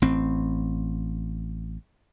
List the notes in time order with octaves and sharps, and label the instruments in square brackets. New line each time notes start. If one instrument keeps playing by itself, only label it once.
[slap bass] A1 C4